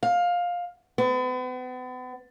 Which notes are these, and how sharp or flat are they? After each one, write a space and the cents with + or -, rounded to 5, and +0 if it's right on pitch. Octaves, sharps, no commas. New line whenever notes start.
F5 +15
B3 +40